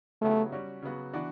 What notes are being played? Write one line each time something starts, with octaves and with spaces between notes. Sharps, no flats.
C#3 F#3 A3 B3 E4 G4
G3 C#4 F#4
C#3 F#3 B3 F#4
E3 B3 D4 F#4